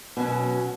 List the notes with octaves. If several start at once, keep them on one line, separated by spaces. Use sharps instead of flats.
B2 F#3 C#4